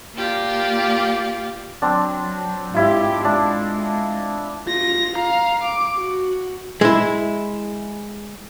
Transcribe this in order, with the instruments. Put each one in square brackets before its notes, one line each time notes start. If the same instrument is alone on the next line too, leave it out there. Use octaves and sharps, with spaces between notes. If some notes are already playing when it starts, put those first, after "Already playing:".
[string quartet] A#3 F4 G4 D5
[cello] F#3 [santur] C4 D4
[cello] G#2 G4 [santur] E4 F4
[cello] G#3 [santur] D4
[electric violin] F4 A#6
F5 A#5
D6
F#4
[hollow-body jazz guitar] G#3 E4